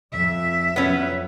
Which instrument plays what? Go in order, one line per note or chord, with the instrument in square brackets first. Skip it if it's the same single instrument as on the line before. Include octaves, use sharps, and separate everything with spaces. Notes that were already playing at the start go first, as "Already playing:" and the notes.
[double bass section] F2 [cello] E5
[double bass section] F2 F#3 [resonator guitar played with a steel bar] B3 C#4